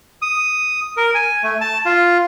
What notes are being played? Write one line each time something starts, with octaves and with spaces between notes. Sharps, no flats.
D#6
A#4
G#5
A3
A5
F4